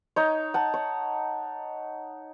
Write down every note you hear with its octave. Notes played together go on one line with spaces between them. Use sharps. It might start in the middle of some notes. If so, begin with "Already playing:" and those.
D#4 C#5
F#5 A5
C#5